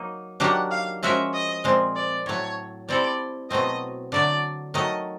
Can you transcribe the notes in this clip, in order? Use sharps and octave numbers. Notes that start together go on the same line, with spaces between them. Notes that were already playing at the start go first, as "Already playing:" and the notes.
Already playing: F#3 A#3 D#4
D#3 F#3 A#3 D4 G4 F#5
F5
F3 G#3 C#4 F#4 A#4 E5
D#5
A#2 F3 G#3 C4
D5
A2 F#3 A3 C#5
G3 C4 E4 A4 D5
B2 F#3 A3 C4 D#5
D3 F#3 A3 D5
D#3 F#3 A3 D#5